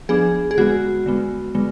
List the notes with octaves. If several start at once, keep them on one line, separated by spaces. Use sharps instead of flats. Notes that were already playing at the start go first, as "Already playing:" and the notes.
F3 B3 D4 G#4
G#4
D3 G#3 B3 F#4
D3 G#3 B3
D3 G#3 B3